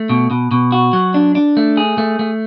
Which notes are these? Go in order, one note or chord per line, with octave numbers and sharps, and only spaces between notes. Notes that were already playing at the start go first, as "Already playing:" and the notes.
Already playing: A3
B2
B2
B2
F#4
F#3
D4
D4
A3
G#4
A3
A3